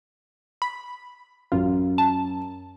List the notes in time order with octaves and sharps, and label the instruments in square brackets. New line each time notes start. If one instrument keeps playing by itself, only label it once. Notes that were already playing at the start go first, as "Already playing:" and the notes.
[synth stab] B5
[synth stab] A1 F4 [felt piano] F#2
[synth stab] A5